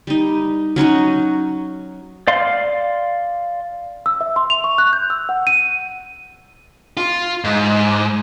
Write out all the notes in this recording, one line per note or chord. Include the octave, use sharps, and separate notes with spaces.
G3 D#4
F#3 C#4 D#4 F#4
D5 F5 C6
E6
E5
C6
F7
C#6
F#6
G6
E6
F#5
D#7
F4
G#2